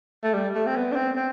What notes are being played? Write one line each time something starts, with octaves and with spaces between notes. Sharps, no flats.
A3
G3
A3
C4
B3
D4
C4
C4